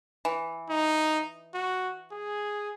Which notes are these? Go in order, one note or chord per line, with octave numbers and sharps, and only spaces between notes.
E3
D#4
F#4
G#4